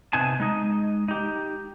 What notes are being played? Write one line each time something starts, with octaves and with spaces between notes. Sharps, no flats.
C3 B3 C4 D#4 G#5 A5
G#3 D#4 D#5
D#4 G4